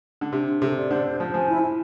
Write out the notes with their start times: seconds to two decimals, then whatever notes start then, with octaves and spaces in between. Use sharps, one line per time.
0.21 D3
0.33 C3 D4
0.47 D4
0.62 C3 A4
0.76 D5
0.90 D3 C5
1.05 C5
1.20 F3 C5
1.34 F3 G#5
1.48 E4
1.62 E4